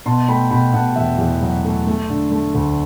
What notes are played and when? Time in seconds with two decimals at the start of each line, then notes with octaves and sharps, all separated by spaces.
0.06 B2 A5 C6
0.28 A3 G5 B5
0.51 B2 G5 B5
0.74 B2 F#5 A5
0.96 E2 E5 G5
1.18 E2
1.41 F#3
1.65 A3
1.87 A3
2.09 D3
2.31 A3
2.54 D2